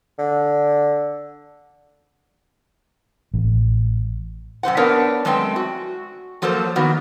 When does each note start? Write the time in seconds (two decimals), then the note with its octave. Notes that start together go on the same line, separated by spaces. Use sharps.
0.19 D3
3.34 A1
4.63 F#2 C3 C5 F#5
4.77 B3 D4 A#4 B4 C#5 F5
5.25 F#2 G#3 A3 C4 B4 G5
5.56 F#4
6.42 F3 F#3 A#3 A4 A#4 C5
6.76 D#3 A#3 B3 F#4